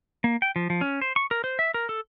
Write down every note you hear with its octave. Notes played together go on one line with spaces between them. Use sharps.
A#3
G5
F3
F3
C#4
C5
C#6
A#4
C5
E5
A#4
A4